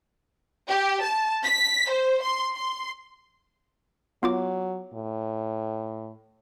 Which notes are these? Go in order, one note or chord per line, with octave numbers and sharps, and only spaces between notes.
G4
A5
B6
C5
C6
C6
F#3 B3 F4 D6
A2